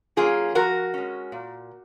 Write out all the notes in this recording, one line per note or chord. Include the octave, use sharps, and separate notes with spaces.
F#3 A#3 C#4 F4 G#4
F3 F#4 A#4
G#3 C#4
A#2